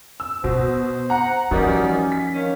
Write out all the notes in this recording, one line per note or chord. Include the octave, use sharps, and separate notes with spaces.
E6
B2 B3 C5
F#5 A#5
A1 F3 G3 C#4 D#4 F#4 A#4
B6
D#3 A#3 C#4